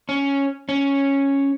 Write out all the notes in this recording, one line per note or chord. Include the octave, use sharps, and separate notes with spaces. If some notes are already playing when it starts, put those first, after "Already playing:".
C#4
C#4